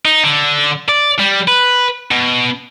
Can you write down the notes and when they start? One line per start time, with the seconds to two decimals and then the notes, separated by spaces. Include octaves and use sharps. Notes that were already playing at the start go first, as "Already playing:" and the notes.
0.05 D#4
0.24 D3
0.89 D5
1.20 G3
1.48 B4
2.12 B2